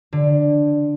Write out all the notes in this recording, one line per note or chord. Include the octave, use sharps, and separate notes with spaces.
D3